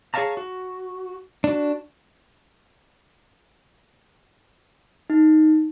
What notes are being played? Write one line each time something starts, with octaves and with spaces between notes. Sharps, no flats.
G#4 C#5 E5 F5 A5 A#5
F#4
D4 F#4
D#4